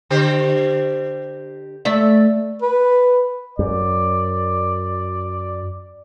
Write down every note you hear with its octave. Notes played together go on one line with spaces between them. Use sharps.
D3 G4 C5
A3 D5 E5
B4
F#2 D5